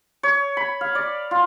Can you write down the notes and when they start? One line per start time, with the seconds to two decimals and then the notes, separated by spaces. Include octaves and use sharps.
0.23 C#5
0.57 B5
0.81 F5
0.95 D5
1.31 F4